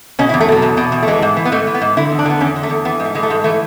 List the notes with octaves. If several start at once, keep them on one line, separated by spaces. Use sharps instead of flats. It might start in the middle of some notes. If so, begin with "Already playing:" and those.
B2 C#4
E4
E2
A3
B2 F#3
E2
B2
E2
A3
E3 G#3
G#2
E3
B3
G#2 A3
E3
B3
G#2
D3 E4
E2
D4
D3 B3
E2 C#4
D3
A3
E2
E3 B3
G#2
A3
E3 G#3
A3
G#2 G#3
E3 A3